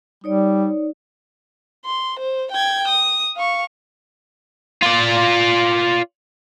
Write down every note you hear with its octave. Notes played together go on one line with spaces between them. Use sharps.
G3 D#4 C#5 D5
C6
C5
G5 G#6
D#6
F5 C#6
F4 D5